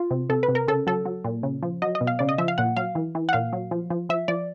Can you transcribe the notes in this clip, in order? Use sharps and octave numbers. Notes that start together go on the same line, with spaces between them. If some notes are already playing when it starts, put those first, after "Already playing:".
Already playing: F4
C3
C3 A4
B4
C3
A#4
C#3 A4
F#3 A4
F#3
A#2
C#3
F3
F#3 D#5
D#5
B2
F5
C#3 D5
D#5
F3 E5
F5
A#2 F#5
F#3 F5
E3
E3
F#5
A#2 F5
F#3
F3
F3
F3 E5
F3 D5